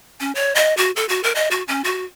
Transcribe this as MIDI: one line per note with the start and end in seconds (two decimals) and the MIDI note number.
0.20 0.32 61
0.35 0.53 73
0.55 0.76 75
0.77 0.91 66
0.96 1.06 69
1.09 1.21 66
1.24 1.32 70
1.35 1.48 75
1.51 1.63 66
1.68 1.82 61
1.84 2.05 66